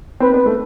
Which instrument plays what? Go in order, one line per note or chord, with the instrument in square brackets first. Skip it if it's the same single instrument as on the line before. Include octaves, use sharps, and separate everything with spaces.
[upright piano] C4 [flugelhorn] B4
[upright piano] B3
A3